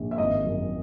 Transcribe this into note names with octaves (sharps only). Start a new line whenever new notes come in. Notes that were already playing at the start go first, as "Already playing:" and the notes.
Already playing: A#1
E5
G#1 D#5
F#2